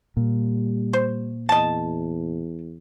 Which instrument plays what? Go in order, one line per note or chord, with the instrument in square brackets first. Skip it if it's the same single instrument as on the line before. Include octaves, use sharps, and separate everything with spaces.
[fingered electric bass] A#2 [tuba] G3
[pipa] C5
[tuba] E2 [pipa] D#5 A5